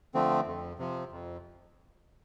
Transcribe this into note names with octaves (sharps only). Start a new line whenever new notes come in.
D3 F3 A3 C4
F2
C3 F3
F2